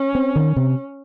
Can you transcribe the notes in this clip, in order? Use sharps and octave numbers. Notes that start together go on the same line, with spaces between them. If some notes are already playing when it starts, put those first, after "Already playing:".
Already playing: C#4
C4
D#3
C3